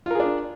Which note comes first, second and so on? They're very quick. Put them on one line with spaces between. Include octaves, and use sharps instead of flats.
F4 A#4 G#4 D4